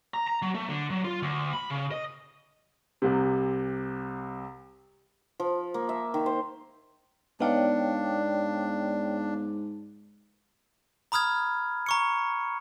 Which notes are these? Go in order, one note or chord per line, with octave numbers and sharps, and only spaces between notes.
A#5
A#5
F#3
A3
D3
F#3
F4
D2
B5
C#3
D#5
C2 C3
F3
A#3
E5
D#3
C5
G#2 B3 D4 D#4 C#5 D5 F5 G5
A#5 B5 D#6 F6 G#6
A#5 C#6 C#7